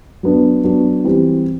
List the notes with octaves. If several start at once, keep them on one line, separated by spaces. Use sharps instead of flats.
F#3 B3 D4
F#3 B3 D4
E3 G3 C4